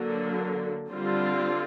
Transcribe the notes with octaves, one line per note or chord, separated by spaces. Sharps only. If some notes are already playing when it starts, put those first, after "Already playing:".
Already playing: D3 F#3 A#3
D3 G3 C4 F4